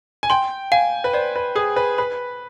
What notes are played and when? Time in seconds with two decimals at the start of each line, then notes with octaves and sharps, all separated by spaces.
0.23 G#5
0.30 G5 C6
0.72 F5 G#5
1.04 B4
1.13 C5 D5
1.36 B4
1.56 G#4 D#6
1.76 B4
1.98 B4 B5